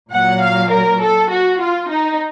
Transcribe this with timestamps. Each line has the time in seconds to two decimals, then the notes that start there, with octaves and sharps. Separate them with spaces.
0.11 A#2 F#3 F#5
0.41 F5
0.71 A#4
1.01 A4
1.30 F#4
1.60 F4
1.90 D#4